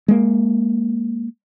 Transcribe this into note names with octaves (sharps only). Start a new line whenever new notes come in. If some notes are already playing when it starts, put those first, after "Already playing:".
G#3 A#3